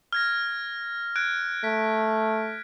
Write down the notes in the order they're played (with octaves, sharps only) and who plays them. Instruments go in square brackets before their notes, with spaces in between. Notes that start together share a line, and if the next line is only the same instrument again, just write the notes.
[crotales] F6 G#6 A#6
F#6 G#6 D7
[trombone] A3 [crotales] B6